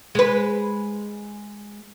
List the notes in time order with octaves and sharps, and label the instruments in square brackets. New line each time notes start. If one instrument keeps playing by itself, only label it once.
[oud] G#3 B4